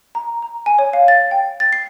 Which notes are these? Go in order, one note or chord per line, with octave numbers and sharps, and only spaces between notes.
A#5
A#5
G#5
C#5
F5
A6
G5
A6
C7